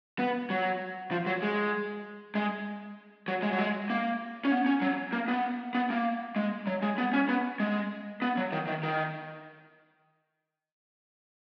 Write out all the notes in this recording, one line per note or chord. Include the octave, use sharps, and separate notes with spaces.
B3
F#3
F3
F#3
G#3
G#3
F#3
G#3
F#3
G#3
A#3
C#4
B3
C#4
F#3
A#3
B3
B3
A#3
G#3
F#3
G#3
B3
C#4
B3
G#3
B3
F#3
D#3
D#3
D#3